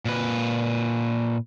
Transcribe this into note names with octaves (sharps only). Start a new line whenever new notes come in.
A#2 B4